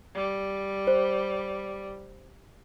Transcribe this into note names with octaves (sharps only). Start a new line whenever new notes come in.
G3
C5